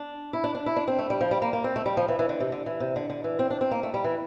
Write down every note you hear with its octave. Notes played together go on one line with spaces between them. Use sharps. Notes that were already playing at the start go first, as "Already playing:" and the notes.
Already playing: D4
E4
D4
D4
E4
D4
C4
A3
G3
F3
G3
A#3
A#3
C4
A3
G3
F3
E3
E3
D3
C3
D3
E3
C3
D3
D3
E3
C4
D4
C4
A#3
A3
G3
E3